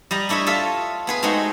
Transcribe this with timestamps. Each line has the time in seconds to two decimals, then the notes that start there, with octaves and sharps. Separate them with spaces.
0.11 G3 D#5 A#5
0.29 D4 E4 C#5 D#5 E5
0.46 F4 A4 C#5 D#5 E5
1.07 B3 G#4 B4
1.23 G#3 A3 C4 D#4 F#4 G#4